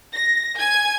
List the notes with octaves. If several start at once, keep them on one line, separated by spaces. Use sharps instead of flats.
A#6
G#5 G#6